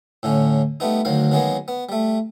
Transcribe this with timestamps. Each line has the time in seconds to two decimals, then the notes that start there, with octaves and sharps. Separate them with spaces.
0.23 A2 D3 C#4
0.80 G3 A3 B3 D#4
1.05 D2 D#3 F#3 F5
1.31 D#3 F#3 G#3 A#3 B3
1.68 B3
1.89 G3 A3